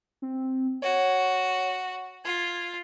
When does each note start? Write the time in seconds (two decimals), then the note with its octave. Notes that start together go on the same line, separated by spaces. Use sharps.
0.22 C4
0.82 F#4 C#5
2.24 F4 G#6